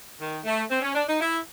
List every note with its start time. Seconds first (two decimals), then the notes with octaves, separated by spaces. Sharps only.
0.20 D#3
0.44 A3
0.70 C4
0.82 C#4
0.94 D4
1.07 D#4
1.20 E4